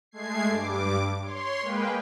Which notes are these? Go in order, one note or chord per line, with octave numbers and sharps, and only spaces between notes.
G#3 A3 G#6 C7
G2 D6
C#5 C6
G#3 A#3 B4 G5